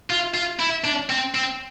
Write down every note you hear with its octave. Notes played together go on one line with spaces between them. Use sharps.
F4
F4
E4
D4
C4
C4